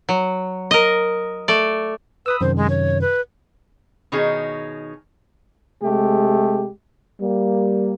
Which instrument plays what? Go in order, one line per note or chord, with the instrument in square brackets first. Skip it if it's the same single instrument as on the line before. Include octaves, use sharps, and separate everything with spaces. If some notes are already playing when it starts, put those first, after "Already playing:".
[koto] F#3
A#4 D#5
A3 D5
[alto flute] B4 [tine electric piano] B5 D#6 E6
[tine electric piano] F#2 C3 D#3 [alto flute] C5
[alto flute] G#3
C#5
B4
[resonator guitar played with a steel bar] B2 D#3 C#4 D#4 G#4
[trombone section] C3 G#3 A3 G4
G3 A#3